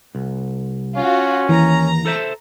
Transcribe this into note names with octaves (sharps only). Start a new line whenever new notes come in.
C2
C#4 F4 F#4
D#2 E3 A#5
A4 C5 E5